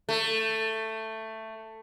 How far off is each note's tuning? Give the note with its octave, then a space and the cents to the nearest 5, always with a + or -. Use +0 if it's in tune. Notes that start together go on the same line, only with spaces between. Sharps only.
A3 +10